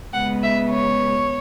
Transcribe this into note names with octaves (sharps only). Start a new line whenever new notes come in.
C#3 G#3 B3 F#5
E5
C#5